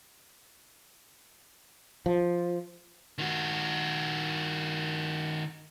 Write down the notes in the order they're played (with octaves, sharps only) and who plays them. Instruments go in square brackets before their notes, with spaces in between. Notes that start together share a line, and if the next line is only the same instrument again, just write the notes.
[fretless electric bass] F3
[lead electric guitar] D#3 F#4